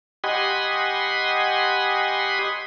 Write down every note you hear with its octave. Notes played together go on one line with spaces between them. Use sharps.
G4 D#5 F#5 G#5 B5 C6